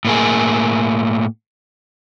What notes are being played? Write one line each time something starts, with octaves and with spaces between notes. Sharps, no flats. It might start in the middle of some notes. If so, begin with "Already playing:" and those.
A2 A#3 G#4